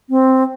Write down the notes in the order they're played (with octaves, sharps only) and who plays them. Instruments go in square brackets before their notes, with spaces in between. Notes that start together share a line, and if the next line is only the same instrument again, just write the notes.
[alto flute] C4